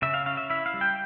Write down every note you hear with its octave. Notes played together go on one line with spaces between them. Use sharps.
C#3 E5
F5
C#4 F5
E5
E4 E5
F5
G3
G5